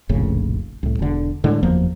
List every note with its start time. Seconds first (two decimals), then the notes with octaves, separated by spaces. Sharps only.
0.09 F1 A#1 A2 C#3
0.83 C2 A2
0.99 E1 D3
1.44 A2 D3 G#3
1.63 F#1 E2 F3 A#3